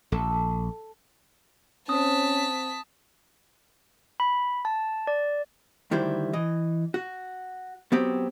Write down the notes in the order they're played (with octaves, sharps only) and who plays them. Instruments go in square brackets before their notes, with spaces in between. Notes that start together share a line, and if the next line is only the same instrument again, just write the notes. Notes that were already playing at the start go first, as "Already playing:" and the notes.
[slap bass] A#1 [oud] A4
[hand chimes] C4 C5 [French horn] C#4 [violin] A5 B6 [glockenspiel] D#6
[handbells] B5
A5
D5
[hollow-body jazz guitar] D2 D#3 G3 E4 C5
E3 D#5
F#4
F#3 B3 C4 G4